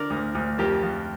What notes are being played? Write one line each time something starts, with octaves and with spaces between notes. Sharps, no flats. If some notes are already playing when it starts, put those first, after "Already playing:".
Already playing: D3 A#4 D5
D2
D2
F2 G4 A#4
F2